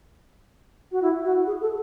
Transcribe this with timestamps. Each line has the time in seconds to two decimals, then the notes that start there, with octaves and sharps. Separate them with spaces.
0.92 F#4
1.02 E4
1.25 F#4
1.47 G#4
1.61 A4